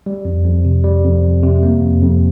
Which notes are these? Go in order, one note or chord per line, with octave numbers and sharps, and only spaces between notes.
G3
F2
F2
C3
G3
F2
F2
C3
A#3
F2
F2